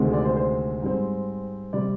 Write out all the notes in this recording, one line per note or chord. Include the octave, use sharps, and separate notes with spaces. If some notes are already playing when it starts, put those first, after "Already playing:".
Already playing: D2 C3 D#3 G#3 C4
D5
C5
C5
G#2 G3 C4
C3 G3 D5